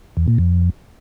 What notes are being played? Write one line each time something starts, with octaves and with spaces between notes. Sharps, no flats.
E2
A#2
F2